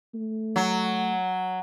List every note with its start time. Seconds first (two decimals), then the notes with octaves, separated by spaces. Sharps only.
0.15 A3
0.56 F#3